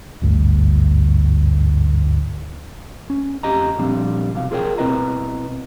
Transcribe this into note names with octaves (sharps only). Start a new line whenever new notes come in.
G#1 D2 G2
C#4
F2 G4 D#5 A#5
A#2 F3 G3 C4 D4
B1 C3 F5
F4 G#4 A#4 C#5 G5
B2 C4 E4 B4 D#5 A#5